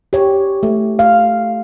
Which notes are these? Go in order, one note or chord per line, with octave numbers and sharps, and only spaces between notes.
G4 C#5
A3
F5